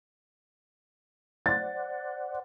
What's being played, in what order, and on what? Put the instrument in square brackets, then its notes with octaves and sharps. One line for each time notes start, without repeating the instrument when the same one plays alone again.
[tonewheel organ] C5 D5 F#5 [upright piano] A6